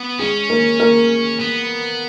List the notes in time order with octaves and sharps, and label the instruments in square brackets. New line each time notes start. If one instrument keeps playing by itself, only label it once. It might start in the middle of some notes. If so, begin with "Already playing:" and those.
Already playing: [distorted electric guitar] B3
[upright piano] G#3 G#4 [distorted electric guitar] C#4
[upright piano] A#3 A#4
A#3 A#4
[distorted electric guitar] B3